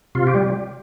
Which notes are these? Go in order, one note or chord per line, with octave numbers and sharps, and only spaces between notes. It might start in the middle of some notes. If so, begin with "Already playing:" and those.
C3 F4
G4
G3